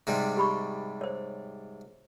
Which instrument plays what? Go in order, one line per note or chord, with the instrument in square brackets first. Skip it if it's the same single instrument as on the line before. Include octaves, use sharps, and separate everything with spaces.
[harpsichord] G#2 C3 G3
[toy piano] G4 B5 C#6
C5 C#5